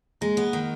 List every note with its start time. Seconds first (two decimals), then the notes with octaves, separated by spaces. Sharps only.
0.21 G#3 A#3
0.37 B3
0.53 D#3